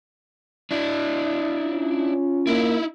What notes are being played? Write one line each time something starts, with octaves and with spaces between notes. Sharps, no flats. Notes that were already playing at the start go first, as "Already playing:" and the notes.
D4 E4
C#4 F4
A#3 D#4 E4